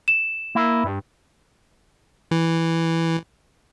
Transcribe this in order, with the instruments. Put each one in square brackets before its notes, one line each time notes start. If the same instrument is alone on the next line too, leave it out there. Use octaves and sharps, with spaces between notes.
[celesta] E7
[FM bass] A#3 [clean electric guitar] E4
[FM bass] G2
[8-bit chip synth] E3